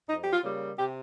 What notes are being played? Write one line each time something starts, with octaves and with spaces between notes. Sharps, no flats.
F2 D#4
G4
F4
C#3 G3 A#3
C3 G4